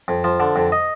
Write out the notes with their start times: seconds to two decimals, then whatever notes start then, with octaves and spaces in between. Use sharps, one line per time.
0.08 F2
0.24 F3
0.40 D3
0.56 F2
0.72 D#5